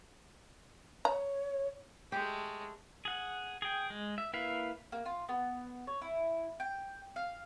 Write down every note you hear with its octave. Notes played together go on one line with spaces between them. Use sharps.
C#5 A#5
G#3 A3 G4
G#4 F#5
G#4 G5
G#3
E5
A#3 E4 B4 E5 F5
A#3
F4
B3
C#5
E4
G5
F5